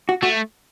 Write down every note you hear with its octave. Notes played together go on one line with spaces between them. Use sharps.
F#4
A3 F#4